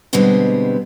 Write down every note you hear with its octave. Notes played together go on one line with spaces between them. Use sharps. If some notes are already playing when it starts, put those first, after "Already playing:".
B2 D3 G3 G#3 B3 C4